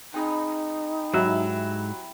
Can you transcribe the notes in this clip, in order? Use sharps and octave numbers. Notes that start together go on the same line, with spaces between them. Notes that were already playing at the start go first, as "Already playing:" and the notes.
C4 D#4 G#4 B5
G#2 F#3 G3 E4 E5